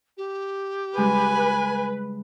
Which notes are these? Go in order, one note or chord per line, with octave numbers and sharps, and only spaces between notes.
G4
C#3 G3 G#3 B4 G#5